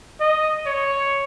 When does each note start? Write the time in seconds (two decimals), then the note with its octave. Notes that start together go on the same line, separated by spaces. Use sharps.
0.20 D#5
0.66 C#5